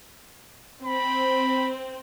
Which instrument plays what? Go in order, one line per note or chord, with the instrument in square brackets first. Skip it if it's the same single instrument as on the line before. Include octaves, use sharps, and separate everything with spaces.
[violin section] C4 [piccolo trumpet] B5